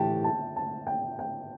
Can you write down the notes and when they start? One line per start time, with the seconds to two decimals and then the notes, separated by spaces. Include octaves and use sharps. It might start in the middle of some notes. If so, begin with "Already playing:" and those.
Already playing: A2 E3 A3 G4 G5 A5
0.24 A5
0.56 A5
0.87 G5
1.19 G5